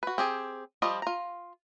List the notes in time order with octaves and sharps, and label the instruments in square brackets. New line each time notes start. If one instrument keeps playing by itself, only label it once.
[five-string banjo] F#4 B4
C4 G4 G#4
F3 G3 F4 G4 D#5
F4 A#5